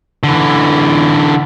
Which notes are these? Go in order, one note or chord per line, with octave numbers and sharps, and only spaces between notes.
D3 E3